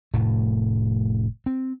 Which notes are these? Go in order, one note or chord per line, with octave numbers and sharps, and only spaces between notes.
F1 A2 A3
C4